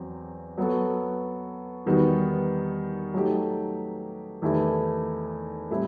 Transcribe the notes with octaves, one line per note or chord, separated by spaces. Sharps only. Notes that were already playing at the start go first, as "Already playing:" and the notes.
Already playing: E2 F#3 C4
F#3 B3 F#4 A4
E2 D#3 G3 B3 F#4
F#3 A3 D#4 G4
E2 D#3 A3 E4 G4
A2 G3 C4 E4